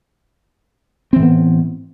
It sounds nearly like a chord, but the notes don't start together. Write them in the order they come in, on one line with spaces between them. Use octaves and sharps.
C4 E3 A2 B3